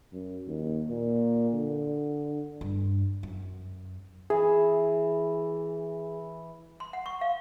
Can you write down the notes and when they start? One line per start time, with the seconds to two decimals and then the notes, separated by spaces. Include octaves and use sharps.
0.13 F#2
0.47 D#2
0.89 A#2
1.53 D3
2.61 G2
3.23 F#2
4.30 E3 G#4
6.80 C6
6.93 F#5
7.06 C#6
7.21 F5